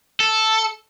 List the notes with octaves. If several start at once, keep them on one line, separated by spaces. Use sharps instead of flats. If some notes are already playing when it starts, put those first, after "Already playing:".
A4